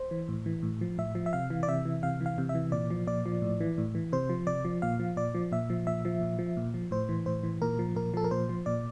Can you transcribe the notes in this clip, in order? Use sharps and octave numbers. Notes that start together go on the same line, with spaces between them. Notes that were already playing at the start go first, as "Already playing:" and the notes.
Already playing: C5
E3
A2
E3
A2
F3
A2 E5
F3
E5
C3 F5
E3
D5
C3 E5
E3
C3 F5
E3
F5
C3
E5
E3
A#2 D5
F3
A#2 D5
F3
A2
E3
A2
E3
C3 C5
F3
C3 D5
F3
A#2 F5
F3
A#2 D5
F3
A#2 E5
F3
A#2 E5
F3
A#2
F3
A#2
F3
A2 C5
E3
A2 C5
E3
A#2 A#4
F3
A#2 A#4
F3 A4
A#4
A#2 C5
F3
A#2 D5